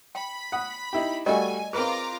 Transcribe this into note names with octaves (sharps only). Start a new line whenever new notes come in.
G5 B5
F#5 D#6
D#4 E4 G4
G3 A3 F#4 A#4 D5 D#5 G#5
C4 F4 G#4 A#4 B4 A#5 D6